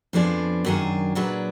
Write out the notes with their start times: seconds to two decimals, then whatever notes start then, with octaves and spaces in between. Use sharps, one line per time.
0.13 F2 F3 B3 D4 G#4
0.65 F#2 D#3 F#3 D4 G#4
1.15 A#2 F#3 D4 G#4 B4